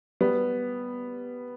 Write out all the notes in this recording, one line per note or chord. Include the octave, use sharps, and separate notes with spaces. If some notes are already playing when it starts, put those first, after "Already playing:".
G3 B3